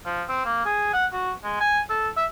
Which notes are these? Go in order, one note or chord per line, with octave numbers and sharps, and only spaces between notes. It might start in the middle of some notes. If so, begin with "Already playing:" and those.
F3
C4
A#3
G#4
F#5
F#4
G#3
G#5
A4
E5